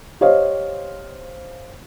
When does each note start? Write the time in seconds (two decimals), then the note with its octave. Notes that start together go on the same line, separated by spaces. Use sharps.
0.21 G4 C5 C#5 D#5 F5